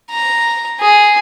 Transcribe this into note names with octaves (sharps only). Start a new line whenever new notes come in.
A#5
G#4